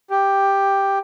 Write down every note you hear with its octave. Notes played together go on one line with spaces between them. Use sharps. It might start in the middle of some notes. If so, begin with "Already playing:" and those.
G4